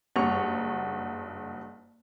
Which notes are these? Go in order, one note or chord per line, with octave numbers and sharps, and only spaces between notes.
F#1 G2 F#5 C#6 F7